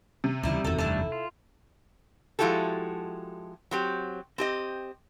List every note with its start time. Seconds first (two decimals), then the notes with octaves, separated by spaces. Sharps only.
0.24 C3
0.43 D2 C#3 E3 G3 D#4 E4
0.65 F#1 E2 D#3 F#4 A4
0.79 G3 A3 D4 E4 A4
1.12 F4
2.39 F3 G#3 E4 F#4 G4 A4
3.71 F#3 C4 G4
4.38 C4 G4 D#5